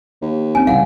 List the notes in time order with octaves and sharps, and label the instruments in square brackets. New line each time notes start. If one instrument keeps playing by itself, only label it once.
[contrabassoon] D#2
[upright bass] C4 [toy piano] C#4 G#5
[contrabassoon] C2 [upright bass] C#3 G3 [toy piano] F5 F#5